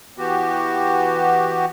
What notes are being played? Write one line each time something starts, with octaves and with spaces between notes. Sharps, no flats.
E3 B3 F#4 G4